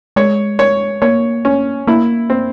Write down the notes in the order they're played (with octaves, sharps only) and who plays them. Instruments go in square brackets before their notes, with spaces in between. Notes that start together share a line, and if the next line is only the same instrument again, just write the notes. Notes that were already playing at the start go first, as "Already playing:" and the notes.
[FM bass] G#3 [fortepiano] C#5
[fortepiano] C#5
[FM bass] A#3 [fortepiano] C#5
[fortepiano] C#4
[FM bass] A#3 [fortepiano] E4
[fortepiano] C4